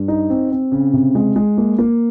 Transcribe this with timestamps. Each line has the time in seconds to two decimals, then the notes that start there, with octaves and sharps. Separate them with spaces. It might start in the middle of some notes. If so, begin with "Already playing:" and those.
Already playing: G2
0.08 D#4
0.30 C4
0.51 C4
0.72 C#3
0.93 C3
1.15 G#3
1.36 G#3
1.58 A#3
1.79 A#3